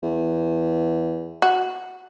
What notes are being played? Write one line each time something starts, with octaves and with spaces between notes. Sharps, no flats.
E2
F#4